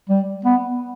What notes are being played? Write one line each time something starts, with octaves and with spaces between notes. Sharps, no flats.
G3
B3